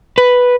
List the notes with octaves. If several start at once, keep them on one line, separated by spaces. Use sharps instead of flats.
B4